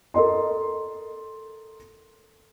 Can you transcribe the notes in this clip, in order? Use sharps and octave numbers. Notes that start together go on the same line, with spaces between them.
A4 A#4 D#5 C6